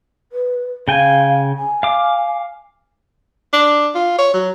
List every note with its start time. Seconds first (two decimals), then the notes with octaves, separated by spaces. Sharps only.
0.32 B4
0.88 C#3 F5 G5 G#5
1.57 G#5
1.83 F5 D6
3.53 D4
3.95 F4
4.18 C#5
4.34 F#3